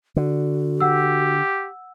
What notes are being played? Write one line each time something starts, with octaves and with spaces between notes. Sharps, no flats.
D3 F#4
G4 F#5 E6